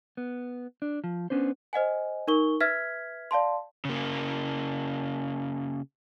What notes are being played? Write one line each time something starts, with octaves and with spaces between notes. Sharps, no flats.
B3
D4
F3
B3 C#4 D4 C5
C5 D#5 F#5 G#5
D#4 A#4 C#6 G7
B4 E5 F6 G#6 B6
D5 F5 A5 C6
C#3 A#3